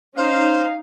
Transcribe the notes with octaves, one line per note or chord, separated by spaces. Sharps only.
C#4 D#4 C5 F5